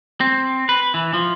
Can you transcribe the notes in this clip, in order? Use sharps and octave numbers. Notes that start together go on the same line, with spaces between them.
C4
B4
E3
F3